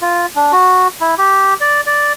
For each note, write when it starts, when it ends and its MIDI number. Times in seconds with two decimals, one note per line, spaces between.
0.01 0.26 65
0.36 0.52 62
0.52 0.88 66
1.01 1.15 64
1.18 1.54 67
1.61 1.81 74
1.87 2.13 74